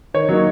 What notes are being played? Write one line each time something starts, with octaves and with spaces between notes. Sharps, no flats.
D#3 C#5
F#3 A#3 D#4